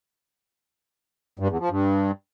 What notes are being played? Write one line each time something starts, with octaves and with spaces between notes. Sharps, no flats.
G2
E2
F3
G2